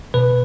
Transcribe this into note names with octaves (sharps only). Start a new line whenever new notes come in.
B2 B4